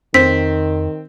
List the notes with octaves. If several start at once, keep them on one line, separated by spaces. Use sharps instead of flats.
F2 D#3 C4 B6